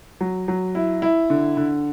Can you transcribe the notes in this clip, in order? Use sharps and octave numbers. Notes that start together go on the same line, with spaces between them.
F#3
F#3
E4
E4
D3
D3